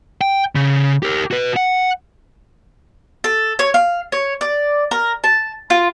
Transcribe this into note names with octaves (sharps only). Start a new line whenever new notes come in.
G5
C#3
G4 A#4
F#4 B4
F#5
A4
C#5
F5
C#5
D5
A#4
A5
F4